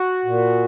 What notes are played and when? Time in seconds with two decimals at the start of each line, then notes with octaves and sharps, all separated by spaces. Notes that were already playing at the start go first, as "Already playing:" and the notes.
Already playing: F#4
0.25 A#2